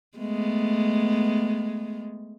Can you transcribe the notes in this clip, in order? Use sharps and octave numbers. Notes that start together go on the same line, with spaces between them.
G#3 A3 B3